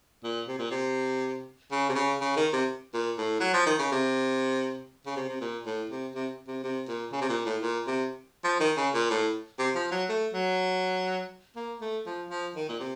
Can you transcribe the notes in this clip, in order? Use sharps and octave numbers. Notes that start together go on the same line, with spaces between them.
A#2
C3
A#2
C3
C#3
C3
C#3
C#3
D#3
C3
A#2
A2
F#3
F3
D#3
C#3
C3
C#3
C3
C3
A#2
A2
C3
C3
C3
C3
A#2
C#3
C3
A#2
A2
A#2
C3
F3
D#3
C#3
A#2
A2
C3
F3
F#3
A3
F#3
A#3
A3
F3
F3
D#3
A#2
C3